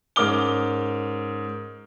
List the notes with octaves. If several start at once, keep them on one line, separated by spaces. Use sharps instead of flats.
G#2 C#4 A#4 D6 F6 G7